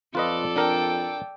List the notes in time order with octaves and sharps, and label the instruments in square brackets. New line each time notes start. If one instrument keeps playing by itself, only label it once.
[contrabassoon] F2 [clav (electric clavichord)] F4 B4 D#5 [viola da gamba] A4 D5
[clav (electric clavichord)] D4 A#4 [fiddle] G5